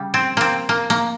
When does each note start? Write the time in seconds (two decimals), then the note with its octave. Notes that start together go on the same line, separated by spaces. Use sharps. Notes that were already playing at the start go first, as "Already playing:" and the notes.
Already playing: C#3 G3
0.14 C4
0.37 A#3 C4
0.69 A#3
0.90 A#3